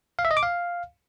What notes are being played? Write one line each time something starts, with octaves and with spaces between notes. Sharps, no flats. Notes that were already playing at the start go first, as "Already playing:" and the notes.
F5
E5
D#5
D6
F5